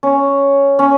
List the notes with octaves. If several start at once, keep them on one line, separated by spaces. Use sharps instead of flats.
C#4
C#4